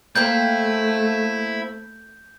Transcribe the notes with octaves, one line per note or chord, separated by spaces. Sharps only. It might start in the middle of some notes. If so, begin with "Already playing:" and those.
A3 A#3 C4 E4 G6